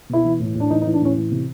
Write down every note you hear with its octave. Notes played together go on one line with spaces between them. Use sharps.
B2 E4
E3
A2
A2 D4
E3 D#4
D#4
E3
D4
A2 C#4
E3
C3